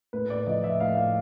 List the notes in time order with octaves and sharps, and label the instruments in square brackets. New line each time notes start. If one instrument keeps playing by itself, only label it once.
[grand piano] A2 B4
D5
F3 D#5
E5
A2 F5
F5